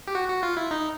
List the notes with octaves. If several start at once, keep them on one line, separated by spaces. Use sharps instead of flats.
G4
F#4
F#4
F4
E4
D#4